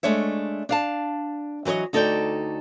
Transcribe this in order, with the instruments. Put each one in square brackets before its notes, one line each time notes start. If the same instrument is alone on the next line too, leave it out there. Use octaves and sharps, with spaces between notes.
[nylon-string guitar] G#3 A3 D4 C#5 E5
D4 F5 A5
E3 F#3 B4 C#5 D#5
D2 D#4 A4 C#5 D5 G5